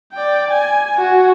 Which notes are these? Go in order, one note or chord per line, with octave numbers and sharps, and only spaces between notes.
D5 G5
G#5
F#4